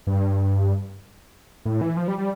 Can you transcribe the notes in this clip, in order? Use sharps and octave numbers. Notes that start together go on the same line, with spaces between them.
G2
A2
E3
F3
G3
G3